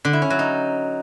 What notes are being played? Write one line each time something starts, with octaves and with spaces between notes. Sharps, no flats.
D3
E4
C#4
F#3
D#4